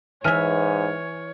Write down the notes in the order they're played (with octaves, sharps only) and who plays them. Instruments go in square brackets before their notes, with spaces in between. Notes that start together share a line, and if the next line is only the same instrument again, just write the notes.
[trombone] G#2 [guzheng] E3 E5 [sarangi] C#5 [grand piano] G#5 F6 D#7